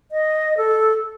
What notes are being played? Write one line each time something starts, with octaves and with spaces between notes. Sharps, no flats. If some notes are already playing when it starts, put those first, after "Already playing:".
D#5
A4